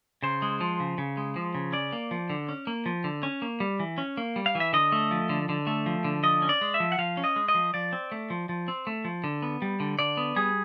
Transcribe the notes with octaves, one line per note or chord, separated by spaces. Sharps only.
C#3 C5
G#3
F3
C#3
C#3
G#3
F3
C#3
C#4 D5
A#3
F3
D3
C#4
A#3
F3
D3
C#4
A#3
G3
E3
C#4
A#3
G3
F5
E3
E5
D3 D#5
A3
F3
D3
D3
A3
F3
D3
F3 D#5
C#4
D5
G#3
E5
F3
F#5
F3 F5
C#4
D#5
G#3
D#5
F3
F3 D5
C4
A3
F3
F3
C4
A3
F3
D3
B3
G3
D3
D3 D5
B3
G3 G#4